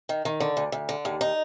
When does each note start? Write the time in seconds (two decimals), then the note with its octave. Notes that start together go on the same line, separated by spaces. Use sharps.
0.09 D#3
0.25 D#3
0.40 D3
0.57 D2
0.72 D2
0.89 D3
1.05 D#2
1.21 D#4